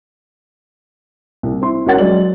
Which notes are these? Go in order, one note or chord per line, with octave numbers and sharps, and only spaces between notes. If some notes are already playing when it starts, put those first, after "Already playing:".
C2
C4 E4 C6
C#2 F#4 A#4 C#5 F#5 A6
F#3 G#3 D5 F#7